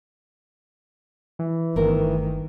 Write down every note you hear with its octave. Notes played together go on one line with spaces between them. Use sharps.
E3
G1 D#3 A3 E4 A#4